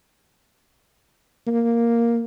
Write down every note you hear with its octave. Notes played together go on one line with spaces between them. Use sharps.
A#3